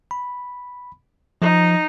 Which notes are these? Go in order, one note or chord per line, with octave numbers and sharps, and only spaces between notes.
B5
F3 D#4